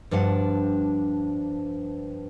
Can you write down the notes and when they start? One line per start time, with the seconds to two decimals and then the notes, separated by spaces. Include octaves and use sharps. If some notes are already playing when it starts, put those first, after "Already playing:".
0.11 G2 F3 D4 D5 F#5